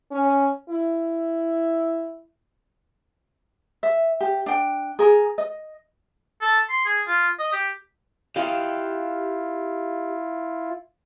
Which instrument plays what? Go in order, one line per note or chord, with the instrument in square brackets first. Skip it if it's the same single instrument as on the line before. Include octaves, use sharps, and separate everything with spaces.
[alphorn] C#4
E4
[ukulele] E5
G4
D4 G5
G#4 A#4
D#5
[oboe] A4
C6
G#4
F4
D#5
G4
[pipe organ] E4 F4 [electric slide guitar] G4 D#5 F5